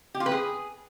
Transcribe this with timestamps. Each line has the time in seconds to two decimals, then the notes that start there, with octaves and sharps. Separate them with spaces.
0.15 G4
0.20 F4
0.26 B4
0.32 G#4